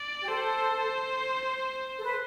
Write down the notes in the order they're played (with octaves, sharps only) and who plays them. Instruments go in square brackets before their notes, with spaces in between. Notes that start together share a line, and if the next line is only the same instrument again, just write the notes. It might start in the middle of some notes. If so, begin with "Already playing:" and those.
Already playing: [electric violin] D5
[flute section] G4
[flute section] A4 [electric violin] C5
[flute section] A4
B4